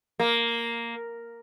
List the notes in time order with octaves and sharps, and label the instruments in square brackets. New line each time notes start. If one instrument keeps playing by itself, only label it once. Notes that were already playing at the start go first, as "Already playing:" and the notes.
[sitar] A#3